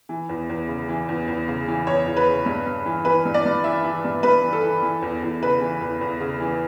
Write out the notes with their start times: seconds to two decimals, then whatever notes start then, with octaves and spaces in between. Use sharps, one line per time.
0.09 E3
0.29 E2
0.49 E2
0.68 C#3
0.89 E3
1.08 E2
1.28 E2
1.48 C#3
1.68 E3
1.87 E2 C#5
2.06 E2
2.17 B4
2.27 C#3
2.46 G2
2.66 G2
2.85 E3
3.05 E3 B4
3.25 G2
3.34 D5
3.45 G2
3.64 E3 E5
3.84 E3
4.05 G2
4.23 G2 B4
4.43 E3
4.53 A4
4.63 E3
4.82 E3
5.02 E2
5.22 E2
5.42 C#3 B4
5.61 E3
5.81 E2
6.01 E2
6.20 C#3
6.40 E3